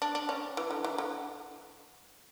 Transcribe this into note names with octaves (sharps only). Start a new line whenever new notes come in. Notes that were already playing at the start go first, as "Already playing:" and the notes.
D4
D4
C#4
E3
D3
E3
D3